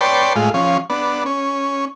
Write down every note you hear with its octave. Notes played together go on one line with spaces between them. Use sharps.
B4 C#5 D5 G5 A5 C6
A2 G#3 F4
F3 C#4
B3 D4
C#4